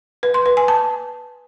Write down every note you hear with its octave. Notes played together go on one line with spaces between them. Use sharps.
B4
C6
B4
G#5
A5